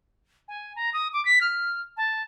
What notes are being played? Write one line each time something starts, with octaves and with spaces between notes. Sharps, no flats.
G#5
A#5
D#6
D6
B6
F6
A5